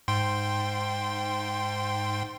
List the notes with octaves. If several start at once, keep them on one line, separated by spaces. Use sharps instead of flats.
G#2 G5 C6